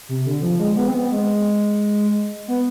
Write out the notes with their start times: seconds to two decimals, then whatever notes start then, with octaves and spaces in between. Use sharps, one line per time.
0.09 C3
0.26 D3
0.42 F3
0.59 G#3
0.77 B3
0.88 C4
0.94 B3
1.11 G#3
2.48 B3